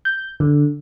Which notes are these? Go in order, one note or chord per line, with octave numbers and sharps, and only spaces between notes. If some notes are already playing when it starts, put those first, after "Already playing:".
G6
D3